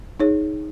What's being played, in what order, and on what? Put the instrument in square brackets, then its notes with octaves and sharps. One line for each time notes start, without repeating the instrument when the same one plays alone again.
[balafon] D#4 G#4 C#5